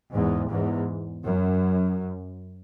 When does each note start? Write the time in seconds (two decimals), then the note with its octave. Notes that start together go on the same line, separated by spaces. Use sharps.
0.12 E2 G#2
0.50 E2 G#2
1.24 F#2